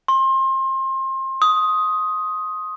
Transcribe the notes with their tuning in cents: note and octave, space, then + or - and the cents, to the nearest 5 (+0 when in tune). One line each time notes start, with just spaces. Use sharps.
C6 +30
D#6 +10